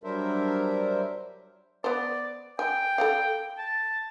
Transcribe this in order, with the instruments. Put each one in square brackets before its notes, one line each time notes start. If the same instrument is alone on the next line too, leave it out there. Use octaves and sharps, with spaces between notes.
[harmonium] F#3 G3 D4 A#4 C5 E5
[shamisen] B3 C5 [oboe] D5
[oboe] G5 [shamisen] G#5
[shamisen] A4 D5 F5
[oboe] A5